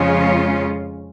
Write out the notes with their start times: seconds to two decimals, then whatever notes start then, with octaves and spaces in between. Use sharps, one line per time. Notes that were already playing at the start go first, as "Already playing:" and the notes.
Already playing: F2 C#3 G#3 C#4 F4